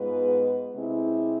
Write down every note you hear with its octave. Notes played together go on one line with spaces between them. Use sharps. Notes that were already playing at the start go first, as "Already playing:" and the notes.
Already playing: G#2 G#3 B3 F4 B4
C3 G#3 C4 E4